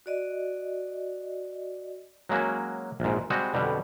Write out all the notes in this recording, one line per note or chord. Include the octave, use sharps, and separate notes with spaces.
F#4 D5 D#5
F#3 G#3 A#3 C#4 F#4
A#1 G#2
G3 G#3 C4 F#4 D#5
F2 B2 D3 G3